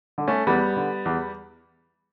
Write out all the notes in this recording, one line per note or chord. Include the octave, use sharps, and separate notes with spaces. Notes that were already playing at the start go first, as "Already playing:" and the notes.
D3
A3 C#4
E2 G3 B3
D3
E2